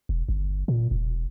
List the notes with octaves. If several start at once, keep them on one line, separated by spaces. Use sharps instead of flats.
E1
G1
A#2
E1